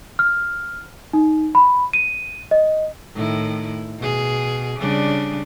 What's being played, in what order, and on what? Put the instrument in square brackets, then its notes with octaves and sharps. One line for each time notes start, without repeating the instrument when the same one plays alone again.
[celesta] F6
D#4
B5
D#7
D#5
[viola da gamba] A2 D#3 E4
B2 G#4
C#3 G3 D4